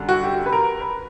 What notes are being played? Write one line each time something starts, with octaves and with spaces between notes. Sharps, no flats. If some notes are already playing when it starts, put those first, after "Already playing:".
Already playing: F#2 D3 G3
F#4
G4
B4
A#4
B4